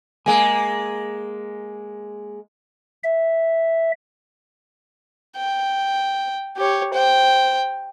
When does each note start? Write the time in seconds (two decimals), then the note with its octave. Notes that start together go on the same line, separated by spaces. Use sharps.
0.26 G#3 A#3 G#5
3.04 E5
5.37 G5
6.57 G4 C#5
6.94 C5 G5